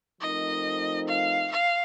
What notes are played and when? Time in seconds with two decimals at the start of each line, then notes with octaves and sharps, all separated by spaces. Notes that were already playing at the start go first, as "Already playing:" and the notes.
0.21 F3 A3 C4 D#4 A#4 D#5
1.08 F5
1.52 F5